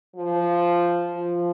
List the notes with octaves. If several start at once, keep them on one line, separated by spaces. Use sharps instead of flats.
F3
F3